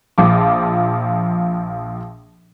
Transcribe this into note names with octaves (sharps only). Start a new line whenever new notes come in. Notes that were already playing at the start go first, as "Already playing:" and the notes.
A#1 F3 D6